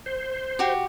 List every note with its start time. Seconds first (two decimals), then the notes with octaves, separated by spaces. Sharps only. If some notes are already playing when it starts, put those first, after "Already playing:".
0.06 C5
0.59 F#4 G4